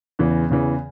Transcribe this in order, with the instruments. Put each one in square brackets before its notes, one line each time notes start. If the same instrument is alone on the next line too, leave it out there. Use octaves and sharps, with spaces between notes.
[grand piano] E2 C#3 E3
E2 C#3 E3